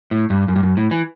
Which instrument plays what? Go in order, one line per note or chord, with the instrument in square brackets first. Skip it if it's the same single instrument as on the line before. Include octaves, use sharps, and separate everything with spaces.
[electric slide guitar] A2
G2
F#2
G2
F#2
A2
E3